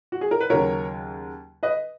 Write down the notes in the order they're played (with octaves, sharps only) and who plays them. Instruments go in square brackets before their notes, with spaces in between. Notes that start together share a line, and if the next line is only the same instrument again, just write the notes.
[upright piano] F#4
G#4
A#4
B4
D#2 C#3 F#3 A#4 C#5
B4 D#5